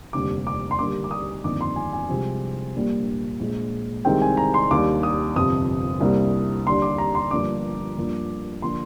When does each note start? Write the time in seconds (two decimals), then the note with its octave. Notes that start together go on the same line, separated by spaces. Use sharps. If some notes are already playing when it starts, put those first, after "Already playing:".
0.13 F1 D#2 D3 G3 D6
0.47 D6
0.71 C6
0.79 D#2 D3 G3 A#3 D4 D6
1.04 D6
1.11 D#6
1.44 G1 F2 D#3 A#3 D4 D6
1.61 C6
1.76 G#5
1.93 G#5
2.09 C2 C3 F3 G#3 C4
2.75 A#1 A#2 G3 A#3 D4
3.40 A#1 A#2 G#3
4.05 C2 C3 D#3 G#3 C4 G5
4.22 G#5
4.37 A#5
4.54 C6
4.71 D#2 D#3 G3 D4 D6
5.03 D#6
5.36 G1 F2 C3 D#6
6.00 C2 C3 G3 A#3 D4
6.67 D#2 D3 G3 D4 C6
6.82 D6
6.98 A#5
7.15 C6
7.31 G1 G2 F3 A#3 D4 D6
7.97 G2 F3 A#3 D4
8.62 D3 F3 A#3 D4 C6